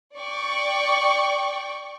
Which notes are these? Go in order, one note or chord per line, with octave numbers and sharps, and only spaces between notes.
D5 G5 C#6